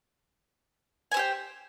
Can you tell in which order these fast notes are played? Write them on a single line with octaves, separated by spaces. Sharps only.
G#5 C5 G4 G5